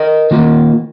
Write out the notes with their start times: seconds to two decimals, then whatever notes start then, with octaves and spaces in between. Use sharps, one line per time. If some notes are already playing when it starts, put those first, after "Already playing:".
Already playing: A#4 D#5
0.31 D#3 A#3 F4